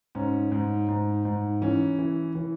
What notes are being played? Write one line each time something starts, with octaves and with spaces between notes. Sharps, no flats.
G#2 C#4
G#2
G#2
G#2
E3 C#4
E3
E3